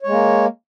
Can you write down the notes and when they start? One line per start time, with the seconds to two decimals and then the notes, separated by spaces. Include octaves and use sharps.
0.02 C#5
0.07 G#3
0.11 A#3